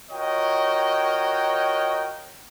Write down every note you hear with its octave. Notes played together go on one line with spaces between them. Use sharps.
F4 F#4 A#4 C#5 D#5 G5